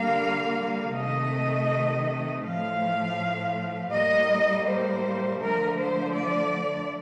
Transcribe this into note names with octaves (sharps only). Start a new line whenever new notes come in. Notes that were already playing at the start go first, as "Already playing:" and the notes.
Already playing: D3 G3 A#3 F5
C3 D#3 A3 D#5
A2 F3 A3 F5
A2 G3 A#3 D#5
C5
D3 F3 A3 A#4
C5
D5